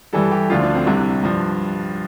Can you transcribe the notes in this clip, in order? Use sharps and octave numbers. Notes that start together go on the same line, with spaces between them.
G2 E3 G3 A4
G4
D2 D3 F3 F4
D4
C4
C2 C3 G3 D4
G2 F3